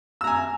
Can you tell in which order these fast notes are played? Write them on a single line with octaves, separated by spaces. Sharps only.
E6 A#5 G#5